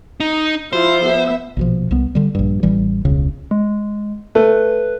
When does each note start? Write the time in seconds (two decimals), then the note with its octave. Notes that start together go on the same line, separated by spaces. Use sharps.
0.20 D#4
0.73 F3 E4 F4 C5
1.06 B3 E5
1.57 A#1 B2 F3
1.91 C2 B3
2.15 D3 G3
2.35 A#1 G2
2.63 A1 E3 G3
3.05 E1 C#2 C#3
3.51 G#3
4.35 A3 B4